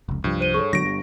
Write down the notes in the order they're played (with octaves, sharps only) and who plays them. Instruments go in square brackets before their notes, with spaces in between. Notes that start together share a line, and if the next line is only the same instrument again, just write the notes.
[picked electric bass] F1 C#2
[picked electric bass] C2 F3 [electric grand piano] G2
[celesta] C5 D#7 G7
[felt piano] G#4 A4 C#5 [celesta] C#6
[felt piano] G1 [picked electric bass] D3 F#3 [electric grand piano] A#6 D7
[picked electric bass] G2